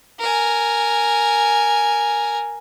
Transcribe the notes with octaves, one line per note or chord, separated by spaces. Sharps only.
A#4 G#5